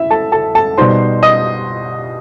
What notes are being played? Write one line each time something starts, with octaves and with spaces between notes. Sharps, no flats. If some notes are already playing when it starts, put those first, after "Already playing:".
Already playing: E4 E5
A4 A5
A4 A5
A4 A5
B2 G3 D#4 C5 C6
D#5 D#6